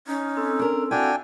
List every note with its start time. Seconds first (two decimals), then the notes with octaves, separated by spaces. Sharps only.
0.07 C#4 D#4
0.37 C4 A4 E6
0.59 D4 A#4
0.91 D4 E4 F#4 F5 G5 G#5